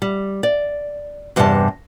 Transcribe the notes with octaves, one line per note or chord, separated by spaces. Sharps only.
G3
D5
E2 G2 C3 G3 D#5 A5